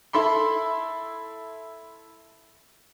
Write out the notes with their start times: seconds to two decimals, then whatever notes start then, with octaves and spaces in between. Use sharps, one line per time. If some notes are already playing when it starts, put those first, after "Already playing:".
0.13 E4 A4 B5 C6